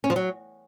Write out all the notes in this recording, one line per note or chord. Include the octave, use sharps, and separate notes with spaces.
C#4
F3
F#3